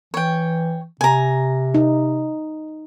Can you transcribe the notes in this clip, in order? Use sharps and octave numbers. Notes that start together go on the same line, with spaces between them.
E3 C#5 G5
C3 G#5 A#5
D#4